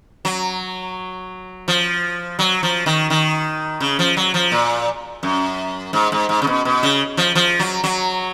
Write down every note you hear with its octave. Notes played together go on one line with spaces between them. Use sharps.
F#3
F3
F#3
F3
D#3
D#3
C#3
F3
F#3
F3
A#2
F#2
G#2
G#2
G#2
C#3
B2
B2
C#3
F3
F3
F#3
F#3